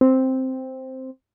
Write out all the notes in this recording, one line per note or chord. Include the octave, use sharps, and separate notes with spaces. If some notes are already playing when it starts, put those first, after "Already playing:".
C4